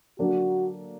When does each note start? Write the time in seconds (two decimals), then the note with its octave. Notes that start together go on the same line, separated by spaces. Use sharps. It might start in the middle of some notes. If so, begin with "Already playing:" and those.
0.19 D3 F#3 A#3 D4 F#4